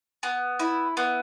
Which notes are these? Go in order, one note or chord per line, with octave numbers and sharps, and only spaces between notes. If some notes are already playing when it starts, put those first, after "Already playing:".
B3
E4
B3